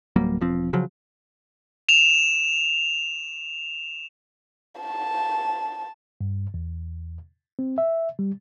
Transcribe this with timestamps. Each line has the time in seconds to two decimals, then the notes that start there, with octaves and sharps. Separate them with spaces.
0.16 D1 F#3 G3 A#3
0.41 E1 F3 C4
0.73 C#3 F3 F#3
1.89 E7 F7
4.81 A5
6.21 G2
6.54 E2
7.59 C4
7.78 E5
8.19 G3